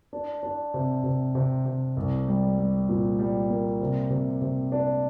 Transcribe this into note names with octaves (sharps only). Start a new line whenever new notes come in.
D4
D4
C3
C3
C3
C3
C2
G3
G3
A#2
G3
A#3
C3
C3
C3
D4